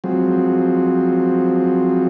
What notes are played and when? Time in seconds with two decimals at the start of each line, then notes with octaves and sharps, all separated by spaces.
0.04 F3 F#3 G#3 C4